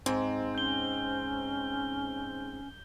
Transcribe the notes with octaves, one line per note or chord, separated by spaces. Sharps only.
G#2 C4
C#4 G6 G7